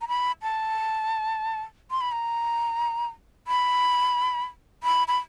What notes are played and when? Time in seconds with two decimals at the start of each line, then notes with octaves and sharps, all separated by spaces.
0.01 A#5
0.08 B5
0.42 A5
1.91 C6
2.01 B5
2.12 A#5
3.47 B5
4.83 B5
5.08 B5